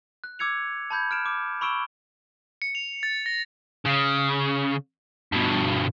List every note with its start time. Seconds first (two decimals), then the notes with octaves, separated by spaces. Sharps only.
0.24 F#6
0.39 D6 E6 G#6 C#7 F7
0.90 A5 B5 G6 G#6
1.11 F6 D7 E7
1.26 D6
1.61 B5 C#6 E6 D7 E7 G7
2.62 C#7
2.75 F7
3.03 A6
3.26 A#6
3.86 C#3
5.32 G2 B2